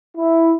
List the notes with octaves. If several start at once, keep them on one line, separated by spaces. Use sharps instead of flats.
E4